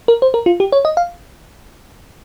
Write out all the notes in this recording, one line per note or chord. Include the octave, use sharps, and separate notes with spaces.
A#4
C5
A#4
F4
G4
C#5
D#5
F5